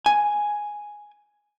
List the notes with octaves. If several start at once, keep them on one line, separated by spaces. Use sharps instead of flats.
G#5